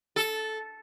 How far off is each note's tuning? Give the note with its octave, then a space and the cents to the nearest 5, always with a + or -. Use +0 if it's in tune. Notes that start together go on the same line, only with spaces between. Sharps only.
A4 -10